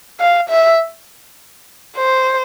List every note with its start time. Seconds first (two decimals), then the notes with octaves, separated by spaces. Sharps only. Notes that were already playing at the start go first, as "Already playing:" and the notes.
0.20 F5
0.49 E5
1.96 C5